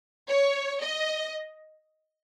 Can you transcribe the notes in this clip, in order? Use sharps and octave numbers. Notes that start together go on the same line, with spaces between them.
C#5
D#5